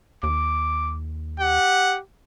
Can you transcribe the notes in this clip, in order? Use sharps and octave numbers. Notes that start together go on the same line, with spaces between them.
D#2 D6
G4 F#5